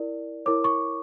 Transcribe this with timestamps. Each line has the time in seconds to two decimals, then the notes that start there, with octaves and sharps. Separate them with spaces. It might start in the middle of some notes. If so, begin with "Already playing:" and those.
Already playing: E4 A#4 D5
0.46 E4 A#4 C#5 D6
0.64 C#6